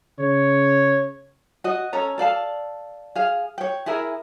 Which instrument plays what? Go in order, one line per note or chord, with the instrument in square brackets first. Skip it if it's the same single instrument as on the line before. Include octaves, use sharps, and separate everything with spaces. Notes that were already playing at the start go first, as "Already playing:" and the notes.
[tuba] C#3 [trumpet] C#5
[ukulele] F#4 D#5
C#4 A4 C#5 A#5
A4 D5 F5 A5
G#4 F5
C#5 G5
E4 G#4 A#4 E5